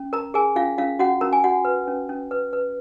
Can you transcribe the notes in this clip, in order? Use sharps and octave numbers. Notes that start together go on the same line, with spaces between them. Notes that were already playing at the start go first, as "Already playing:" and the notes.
Already playing: C#4
A#4 A#5
G#4 A#4 G#5
C#4 F4 F5
C#4 F4 F5
C#4 F#4 F#5
C#4 A#4 A#5
G#5
F#4 F#5
B4
C#4
C#4
B4
B4